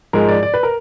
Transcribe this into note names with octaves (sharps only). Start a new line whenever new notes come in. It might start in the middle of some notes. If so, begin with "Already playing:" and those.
G#2 F3 G#3 A#4
D5
D5
B4
A#4